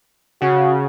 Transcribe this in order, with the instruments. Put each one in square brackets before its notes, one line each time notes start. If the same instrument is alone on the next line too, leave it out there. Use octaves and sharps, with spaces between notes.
[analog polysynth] C#3 [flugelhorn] F#4